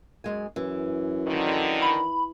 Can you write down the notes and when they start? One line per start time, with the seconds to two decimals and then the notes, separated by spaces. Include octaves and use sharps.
0.24 F#2 G#3 G#5
0.56 F#2 E3
1.27 D3 D#3
1.82 B5